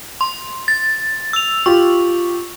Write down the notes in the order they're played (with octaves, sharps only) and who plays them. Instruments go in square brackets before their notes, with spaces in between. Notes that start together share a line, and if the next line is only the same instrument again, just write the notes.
[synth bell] C6
A6
E6 F7
[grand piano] F4 G4 [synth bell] C#6